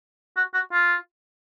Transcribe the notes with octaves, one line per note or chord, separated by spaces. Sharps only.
F#4
F#4
F4